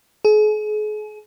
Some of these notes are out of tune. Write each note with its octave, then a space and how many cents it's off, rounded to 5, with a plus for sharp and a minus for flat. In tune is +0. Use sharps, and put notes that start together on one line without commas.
G#4 +40